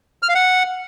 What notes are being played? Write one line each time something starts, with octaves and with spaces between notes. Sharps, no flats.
F6
F5
F#5